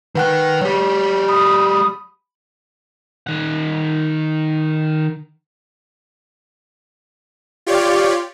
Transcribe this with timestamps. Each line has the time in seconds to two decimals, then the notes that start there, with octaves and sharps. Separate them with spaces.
0.15 D#3 B4 F#5 G5 F#6
0.61 F#3 G4 C#5
1.29 B5 D#6
3.27 D#3 F#5
7.67 F4 G4 C#5 D5